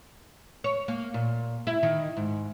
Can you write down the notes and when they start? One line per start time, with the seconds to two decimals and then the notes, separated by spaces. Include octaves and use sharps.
0.64 C#5
0.88 A#3
1.14 A#2
1.67 E4
1.83 D#3
2.17 G#2